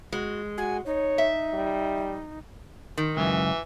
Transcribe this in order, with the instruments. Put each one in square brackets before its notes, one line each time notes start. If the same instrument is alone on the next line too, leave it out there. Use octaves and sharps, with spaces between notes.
[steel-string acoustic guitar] G#3 [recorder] F#4
[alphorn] F#4 [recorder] G#5
[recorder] D#4 [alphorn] C#5
[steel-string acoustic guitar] E5
[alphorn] G3
[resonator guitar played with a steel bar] D#3
[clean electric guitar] C#2 F#2 [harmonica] E3